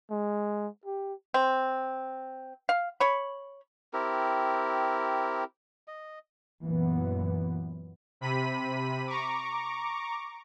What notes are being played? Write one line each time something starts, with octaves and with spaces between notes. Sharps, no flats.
G#3
G4
C4
F5
C#5 B5
C4 E4 G4 A#4
D#5
F#2 A#2 E3 B3
C3 B5 B6 D#7
A#5 C#6 D6